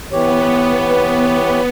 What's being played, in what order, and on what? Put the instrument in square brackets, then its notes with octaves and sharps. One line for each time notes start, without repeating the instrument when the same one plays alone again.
[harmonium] E3 G4 C#5 [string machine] B3